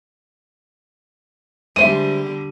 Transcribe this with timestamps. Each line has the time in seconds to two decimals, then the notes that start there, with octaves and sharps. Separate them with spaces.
1.76 D3 G3 G#3 C5 E5 D#7